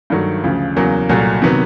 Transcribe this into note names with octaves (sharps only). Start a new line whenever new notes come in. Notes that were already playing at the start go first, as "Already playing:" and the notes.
G2 D#3 F#3 A3
D2 C#3 F3
E2 C#3 F#3 A#3
C2 A#2 F#3 A3
C3 D#3 F#3 B3